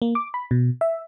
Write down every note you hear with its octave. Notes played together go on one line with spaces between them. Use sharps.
A#3
D6
B5
B2
E5